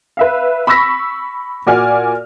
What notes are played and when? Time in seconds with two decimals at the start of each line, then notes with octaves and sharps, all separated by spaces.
0.17 B4 E5 F5
0.67 B5 C#6 E6 A#6 B6
1.66 A#2 F#4 D5 G#5 F6